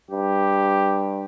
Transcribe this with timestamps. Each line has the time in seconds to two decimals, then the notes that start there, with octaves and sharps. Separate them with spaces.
0.11 G2 G4